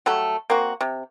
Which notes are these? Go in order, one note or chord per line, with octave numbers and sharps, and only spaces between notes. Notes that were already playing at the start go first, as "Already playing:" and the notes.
F#3 G3 A3 A4
A#3 C4 F#4
C3